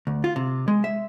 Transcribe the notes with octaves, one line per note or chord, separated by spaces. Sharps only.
D2
F4
C3
G#3
E5